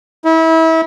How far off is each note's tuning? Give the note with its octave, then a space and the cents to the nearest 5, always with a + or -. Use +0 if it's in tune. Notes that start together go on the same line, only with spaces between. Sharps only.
E4 -30